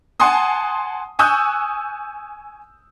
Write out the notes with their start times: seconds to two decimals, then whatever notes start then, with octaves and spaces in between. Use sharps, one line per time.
0.20 F#5 G#5 A5 C6 D#6
1.19 G#5 C#6 D#6 E6 F#6 G6